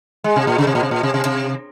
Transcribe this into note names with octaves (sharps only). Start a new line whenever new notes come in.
G#3
C3
A#2
C#3
C3
A#2
C3
A#2
C3
C3
C3